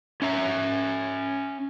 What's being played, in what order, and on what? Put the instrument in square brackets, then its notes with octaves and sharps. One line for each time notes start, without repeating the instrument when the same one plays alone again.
[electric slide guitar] C#4 E5 A#5